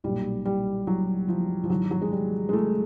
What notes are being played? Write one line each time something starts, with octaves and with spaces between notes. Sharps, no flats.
B1 A#2 G3
G3
F#3
F3
F3
G#1 G#2 E3 F#3
F#3
G#3
G3
G#3
A3